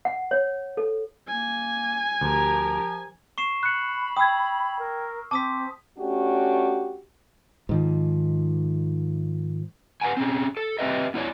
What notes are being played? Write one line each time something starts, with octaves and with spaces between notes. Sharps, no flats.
F#5
C#5
A4
A#3 G#5
D2 F3 G4 A#4
C#6 C7 E7
B5 F#6 C#7
G5 D#6 E6 G#6
A#4
C4 A5 D6 D#6 B6
A3 C#4 D4 F#4 G4
G#2 D#3 F3
B4 F5 F#5 G#5
C4 C#4 G#4
A4
C4 G4 B4 D#5 E5
B3 E4 C#5 D5